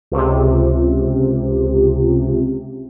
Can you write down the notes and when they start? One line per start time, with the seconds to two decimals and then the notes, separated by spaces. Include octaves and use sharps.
0.12 C#2 C3